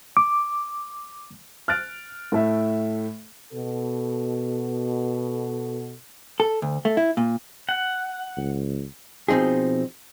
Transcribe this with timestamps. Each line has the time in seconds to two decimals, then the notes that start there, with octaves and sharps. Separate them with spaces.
0.17 D6
1.68 F6 F#6 A6 D7
2.32 A2 A3 E5
3.53 B2 A4
6.40 A4
6.62 D2
6.85 A3
6.97 E4
7.17 A#2
7.69 F#5
8.37 C#2
9.28 B2 F3 C4 D#4 G#4